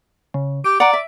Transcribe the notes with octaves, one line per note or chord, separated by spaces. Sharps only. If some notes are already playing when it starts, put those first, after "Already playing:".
C#3
G4 D7
D5 F#5 A#5
E5